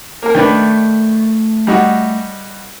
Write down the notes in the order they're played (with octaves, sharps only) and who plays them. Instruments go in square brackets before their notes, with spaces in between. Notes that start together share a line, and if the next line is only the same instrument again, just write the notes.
[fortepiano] A#3 A#4
[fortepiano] D#3 D4 B4 [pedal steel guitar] A3 G5
[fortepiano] G3 D#4 F#4